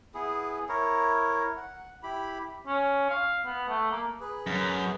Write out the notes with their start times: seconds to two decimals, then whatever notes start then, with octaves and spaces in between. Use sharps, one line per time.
0.14 B3 E4 G#4
0.69 E4 A#4 C#5
1.57 F#5
2.03 E4 G4 B5
2.67 C#4
3.10 F5
3.46 B3
3.69 A3
3.91 A#3
4.20 G#4 B4
4.47 F#2